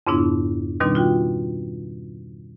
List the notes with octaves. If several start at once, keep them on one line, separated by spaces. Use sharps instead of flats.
F2 G#2 C#3 B3 D4 E4
B2 D#3 G3 C4 D4 D#4
F4 F#4 G5